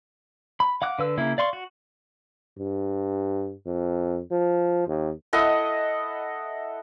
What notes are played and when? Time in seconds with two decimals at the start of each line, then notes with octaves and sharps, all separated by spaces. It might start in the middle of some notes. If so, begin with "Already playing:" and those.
0.60 B5
0.82 F5 F#5 D6 F#6
0.99 D3 B4 E6
1.17 C#3 A#3 E4
1.38 D5 F5 C6 C#6
1.53 F#4
2.59 G2
3.66 F2
4.31 F3
4.88 D#2
5.33 E4 A4 D#5 F#5